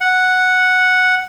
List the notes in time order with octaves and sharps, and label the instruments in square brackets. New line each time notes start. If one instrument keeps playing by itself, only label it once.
[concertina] F#5